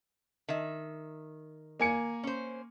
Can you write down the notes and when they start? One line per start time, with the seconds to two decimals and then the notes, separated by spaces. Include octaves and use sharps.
0.48 D#3 E5
1.79 A#3 G#5 C#7
2.23 C#4 C5